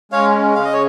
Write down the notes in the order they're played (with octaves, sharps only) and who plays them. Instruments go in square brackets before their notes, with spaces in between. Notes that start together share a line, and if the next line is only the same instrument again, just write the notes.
[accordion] G#3 C#4 [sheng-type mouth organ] C#5 F5
[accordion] C#3 [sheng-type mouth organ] F5
[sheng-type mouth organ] D#5
C#5